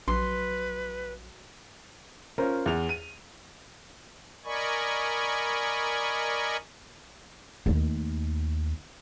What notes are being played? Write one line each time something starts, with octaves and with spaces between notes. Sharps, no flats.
A#1 F#3 B4 C6
C#4 F4 A#4 C5
E2 F7
D#7
A#4 D5 D#5 G#5 B5 C#6
D#2 A3